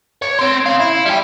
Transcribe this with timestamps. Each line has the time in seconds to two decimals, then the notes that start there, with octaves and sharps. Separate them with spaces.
0.22 C#5
0.39 C4 C6
0.66 C#3 F5
0.80 E4
1.06 G3 G5